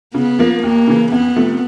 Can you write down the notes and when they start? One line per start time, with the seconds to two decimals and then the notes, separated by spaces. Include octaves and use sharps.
0.14 C#3 B3
0.39 F3 A#3
0.63 D#2 A#3
0.87 C#3 E3
1.12 F2 B3
1.36 C3 F3 A3